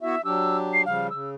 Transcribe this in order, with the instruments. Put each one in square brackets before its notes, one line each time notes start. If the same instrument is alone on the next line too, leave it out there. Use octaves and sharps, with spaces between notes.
[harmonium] B3 E4 F#4 [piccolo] E5
[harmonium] F#3 D4 G4 [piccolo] E6
[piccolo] C7
[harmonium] C#3 F3 G3 [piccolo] F5
[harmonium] C#3 [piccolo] E6